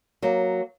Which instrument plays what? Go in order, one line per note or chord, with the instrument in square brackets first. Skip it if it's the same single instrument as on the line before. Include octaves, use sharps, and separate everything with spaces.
[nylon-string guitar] F#3 A#3